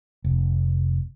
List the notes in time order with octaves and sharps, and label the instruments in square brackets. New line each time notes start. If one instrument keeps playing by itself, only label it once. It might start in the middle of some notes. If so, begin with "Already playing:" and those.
[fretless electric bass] F1